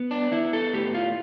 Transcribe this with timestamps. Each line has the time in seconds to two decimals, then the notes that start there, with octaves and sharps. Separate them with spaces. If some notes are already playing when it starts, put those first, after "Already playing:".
Already playing: B3
0.11 D4
0.32 B3 E4
0.53 A4
0.73 A2 G4
0.94 F4